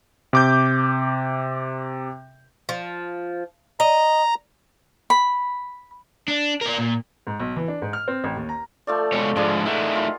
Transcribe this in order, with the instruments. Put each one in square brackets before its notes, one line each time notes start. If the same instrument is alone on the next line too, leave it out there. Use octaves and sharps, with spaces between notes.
[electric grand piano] C3 D6 G6
[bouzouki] F3
[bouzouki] D#5 [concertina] A#5
[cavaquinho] B5
[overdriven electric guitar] D4
A#4 D5
A#2
[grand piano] G#2
B1
E3
D4
G#2
F6
C4
A1
D#2
A#5
[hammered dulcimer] F3 A3 D5
[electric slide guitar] B2 G#3 C#5
[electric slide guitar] G#2 D3 F3 [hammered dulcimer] G#3 G#4 D5
[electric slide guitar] A3 D#4 E4 [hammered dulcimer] A#4 F#5
[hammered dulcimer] F4